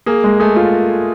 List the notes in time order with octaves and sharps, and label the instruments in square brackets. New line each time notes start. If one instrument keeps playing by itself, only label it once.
[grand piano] A#3 [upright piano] G#4
[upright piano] G#3
[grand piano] A3 [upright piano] G#4
[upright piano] F4